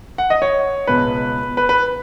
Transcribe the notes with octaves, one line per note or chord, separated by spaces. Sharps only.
F#5
D#5
C#5
C#2 B2 B3 B4
B4
B4